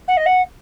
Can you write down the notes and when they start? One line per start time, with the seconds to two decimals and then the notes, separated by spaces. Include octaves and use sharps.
0.08 F#5
0.17 D#5
0.26 F#5